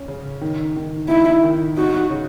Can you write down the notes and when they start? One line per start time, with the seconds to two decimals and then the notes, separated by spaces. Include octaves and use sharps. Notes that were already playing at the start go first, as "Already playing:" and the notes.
Already playing: C#4
0.08 C#3
0.41 D#3
0.76 D#3
1.09 D#4 E4
1.43 D#3
1.77 D#4 F#4
2.10 C#3